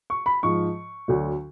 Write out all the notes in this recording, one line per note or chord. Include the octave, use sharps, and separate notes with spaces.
C#6
B5
G#2 F3 C#6
D2 D3 F#3